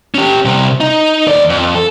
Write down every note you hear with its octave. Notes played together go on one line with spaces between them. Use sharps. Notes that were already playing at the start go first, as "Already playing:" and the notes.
C#4 G4
C3 G3
D#4
D#2 D5
F2
A4